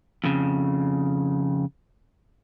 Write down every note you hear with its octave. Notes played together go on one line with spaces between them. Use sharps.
F2 C#3